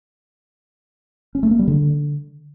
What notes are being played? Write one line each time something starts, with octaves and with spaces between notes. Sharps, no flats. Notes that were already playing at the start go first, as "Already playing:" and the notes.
C#4
A3
A#3
G3
D3